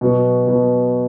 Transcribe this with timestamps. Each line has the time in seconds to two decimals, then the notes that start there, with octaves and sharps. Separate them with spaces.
0.01 B2 F#3 B3 F#4
0.47 B2 F#3 B3 F#4